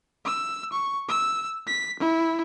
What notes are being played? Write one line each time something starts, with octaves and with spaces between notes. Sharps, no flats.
E6
C#6
E6
B6
E4